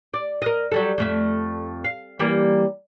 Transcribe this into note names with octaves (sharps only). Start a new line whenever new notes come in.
D5
A#4 D#5
F#3 G3 A4
F2 A3 E5
F5
E3 G3 A#3